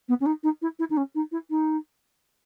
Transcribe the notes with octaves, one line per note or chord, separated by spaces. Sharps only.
B3
C#4
D#4
D#4
E4
E4
D#4
C#4
D#4
E4
D#4